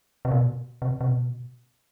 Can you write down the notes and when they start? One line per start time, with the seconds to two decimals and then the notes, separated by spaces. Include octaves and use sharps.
0.25 C3
0.32 B2
0.82 C3
1.01 C3
1.07 B2